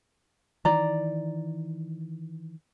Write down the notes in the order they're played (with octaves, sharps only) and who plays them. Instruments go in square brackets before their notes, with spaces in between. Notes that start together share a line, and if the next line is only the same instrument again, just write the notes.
[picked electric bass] D#3 E3 [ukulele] D5 A#5